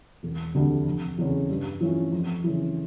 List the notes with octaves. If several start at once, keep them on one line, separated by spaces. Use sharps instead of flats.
E1
D2 D3 G3 D4
F1
E2 C#3
G2
E3 A3 C#4 F4
F2
C#3 E3